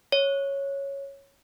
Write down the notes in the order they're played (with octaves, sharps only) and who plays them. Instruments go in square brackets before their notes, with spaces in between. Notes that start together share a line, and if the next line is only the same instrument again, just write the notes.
[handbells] C#5